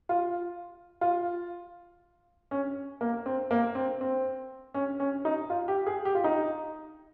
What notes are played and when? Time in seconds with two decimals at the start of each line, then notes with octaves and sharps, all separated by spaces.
0.09 F4
1.01 F4
2.51 C#4
3.01 A#3
3.26 C4
3.51 A#3
3.75 C4
4.01 C4
4.74 C#4
5.00 C#4
5.25 D#4
5.50 F4
5.68 G4
5.86 G#4
6.05 G4
6.15 F4
6.24 D#4